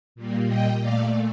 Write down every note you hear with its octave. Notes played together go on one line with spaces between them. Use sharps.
A#2 G3 A#3
D#5 G5
A#2 A3 D5 F5